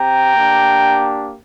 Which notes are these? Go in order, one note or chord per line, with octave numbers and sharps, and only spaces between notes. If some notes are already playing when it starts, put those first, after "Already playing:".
Already playing: C4 G4 G5 A#5
A#3 D4 G4